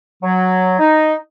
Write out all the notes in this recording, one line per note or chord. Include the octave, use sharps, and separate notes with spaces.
F#3
D#4